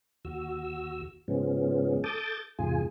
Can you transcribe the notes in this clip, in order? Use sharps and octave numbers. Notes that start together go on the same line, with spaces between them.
D#2 F#4 E6
G#2 C#3 F3 G#3 B3 C#4
A4 A5 D6 D#6 G6 A6
E2 G#2 C3 F4 G#4 G#5